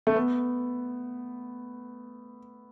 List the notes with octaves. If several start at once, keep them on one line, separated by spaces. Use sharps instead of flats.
A3
B3